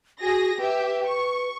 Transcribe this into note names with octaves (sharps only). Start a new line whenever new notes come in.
F#4 G#4 A#6
G4 B4 E5
C#6